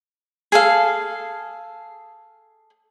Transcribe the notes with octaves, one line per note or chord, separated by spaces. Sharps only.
G#4 A4 F5